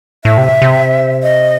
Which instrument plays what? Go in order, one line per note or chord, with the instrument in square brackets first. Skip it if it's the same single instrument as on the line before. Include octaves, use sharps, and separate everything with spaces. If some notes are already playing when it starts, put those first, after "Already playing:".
[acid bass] A2 [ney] E5
[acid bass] C3
C3
[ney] D#5